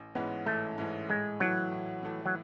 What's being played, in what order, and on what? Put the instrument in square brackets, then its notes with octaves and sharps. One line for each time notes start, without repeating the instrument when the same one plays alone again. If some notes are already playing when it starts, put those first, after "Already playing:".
Already playing: [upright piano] A1
[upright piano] G#2 E3 G#3 C#4 [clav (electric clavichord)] B3
[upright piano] A1 [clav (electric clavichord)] A3
[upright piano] G#2 E3 G#3 C#4
[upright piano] A2 [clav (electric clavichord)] G#3
[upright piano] E3 A3 E4 [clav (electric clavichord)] F#3
[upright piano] A2
E3 A3 E4
[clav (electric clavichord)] F#3